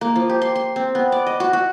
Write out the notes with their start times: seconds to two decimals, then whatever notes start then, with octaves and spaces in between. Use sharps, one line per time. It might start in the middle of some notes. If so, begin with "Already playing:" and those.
0.01 A#3
0.16 F3
0.29 G4
0.42 C6
0.56 C6
0.76 C4
0.95 B3
1.12 D5
1.27 D#5
1.40 F#4
1.53 F#4